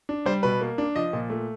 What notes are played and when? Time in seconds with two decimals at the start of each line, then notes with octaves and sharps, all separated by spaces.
0.09 D4
0.26 G3 C5
0.43 B2 B4
0.61 A#3
0.78 D4
0.96 F3 D#5
1.13 A#2
1.30 A3